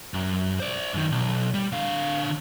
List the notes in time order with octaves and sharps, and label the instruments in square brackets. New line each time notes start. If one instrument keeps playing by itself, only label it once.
[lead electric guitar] F#2
C5 D5
F#2 D#3
B1
G3
D3 F5